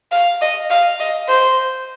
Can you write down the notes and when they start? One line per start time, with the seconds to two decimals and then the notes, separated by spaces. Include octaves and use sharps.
0.12 F5
0.41 D#5
0.70 F5
1.00 D#5
1.28 C5